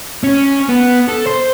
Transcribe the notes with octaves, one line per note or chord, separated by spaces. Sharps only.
C#4
B3
A4
C5